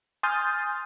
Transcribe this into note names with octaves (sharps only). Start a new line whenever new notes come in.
G#5 C6 D#6 F6 G6 A6